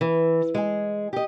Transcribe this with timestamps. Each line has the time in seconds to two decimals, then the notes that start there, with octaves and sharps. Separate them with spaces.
0.01 E3
0.55 G#3 G#4
1.13 G4 D#5